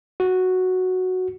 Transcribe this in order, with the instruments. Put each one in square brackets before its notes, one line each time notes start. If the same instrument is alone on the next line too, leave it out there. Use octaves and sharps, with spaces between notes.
[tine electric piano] F#4